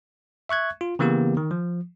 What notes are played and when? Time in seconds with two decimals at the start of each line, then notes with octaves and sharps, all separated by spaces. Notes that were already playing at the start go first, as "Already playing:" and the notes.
0.49 E5 C#6 F#6 G#6
0.81 F4
0.99 C#3 E3 A#3 B3 G4
1.37 D#3
1.51 F3